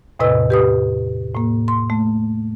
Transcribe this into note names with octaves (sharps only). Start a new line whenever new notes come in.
E2 A2 C3 B4 D#5 E6
G4 B4 D#6
A2 A#3
C6
A3